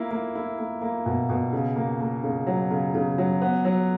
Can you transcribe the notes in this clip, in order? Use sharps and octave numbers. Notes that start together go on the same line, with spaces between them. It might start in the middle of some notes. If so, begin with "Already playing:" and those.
Already playing: A#3 E4
A#3
E4
A#3
A#3
B2
B2
C#3
A#3
A#3
C#3
F#3
C#3
C#3
F#3
B3
F#3